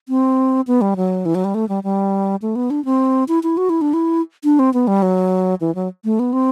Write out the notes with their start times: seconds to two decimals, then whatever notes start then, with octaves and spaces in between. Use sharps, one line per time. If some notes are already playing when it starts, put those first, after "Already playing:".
0.09 C4
0.67 B3
0.81 G3
0.97 F#3
1.26 E3
1.35 F#3
1.44 G3
1.55 A3
1.69 G3
1.84 G3
2.42 A3
2.56 B3
2.70 D4
2.85 C4
3.28 E4
3.43 E4
3.57 F#4
3.70 E4
3.81 D4
3.94 E4
4.44 D4
4.59 C4
4.74 B3
4.87 G3
5.02 F#3
5.61 E3
5.75 F#3
6.05 A3
6.19 B3
6.33 C4